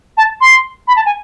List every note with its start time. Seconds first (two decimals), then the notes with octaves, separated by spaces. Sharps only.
0.17 A5
0.41 C6
0.88 B5
0.96 A5
1.06 G#5